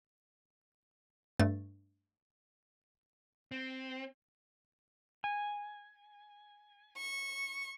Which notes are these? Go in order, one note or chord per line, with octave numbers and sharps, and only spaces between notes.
G2 A3 A6
C4
G#5
C#6